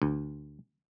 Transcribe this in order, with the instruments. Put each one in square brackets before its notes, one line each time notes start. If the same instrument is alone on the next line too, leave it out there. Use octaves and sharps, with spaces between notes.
[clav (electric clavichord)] D2